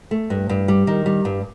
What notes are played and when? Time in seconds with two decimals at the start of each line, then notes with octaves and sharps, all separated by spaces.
0.11 A3
0.30 G2
0.49 G2
0.68 G3
0.87 D#3
1.06 G3
1.25 G2